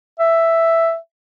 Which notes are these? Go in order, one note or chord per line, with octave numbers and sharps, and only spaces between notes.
E5